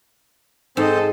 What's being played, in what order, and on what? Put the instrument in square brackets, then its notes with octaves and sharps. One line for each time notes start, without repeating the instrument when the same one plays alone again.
[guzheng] G#2 [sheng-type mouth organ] C4 C5 [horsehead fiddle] A4 D#5